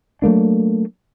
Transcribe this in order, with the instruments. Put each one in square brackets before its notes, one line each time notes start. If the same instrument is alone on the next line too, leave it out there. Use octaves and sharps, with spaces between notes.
[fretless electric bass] F#3 A3 A#3 D4